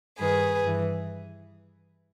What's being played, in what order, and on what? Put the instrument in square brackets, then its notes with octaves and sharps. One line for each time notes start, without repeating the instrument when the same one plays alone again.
[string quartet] G2 D#3 G#4 B4
G2 E3